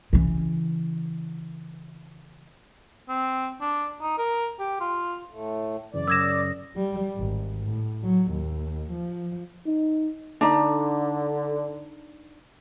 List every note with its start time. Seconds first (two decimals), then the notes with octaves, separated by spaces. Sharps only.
0.13 C#3 E3
3.09 C4
3.61 D4
4.02 D#4
4.18 A#4
4.59 G4
4.81 F4
5.31 A2 A3
5.94 F#2 C#3 E3 D5
6.08 F#2 C#3 D#6 E6 G#6 A#6 E7
6.76 G3
7.16 G#1
7.65 A2
8.03 F#3
8.32 D#2
8.91 F3
9.67 D#4
10.41 D3 D4 D#4